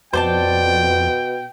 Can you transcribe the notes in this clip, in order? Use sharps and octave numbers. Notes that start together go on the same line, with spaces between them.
F2 B2 C5 D5 G5 A5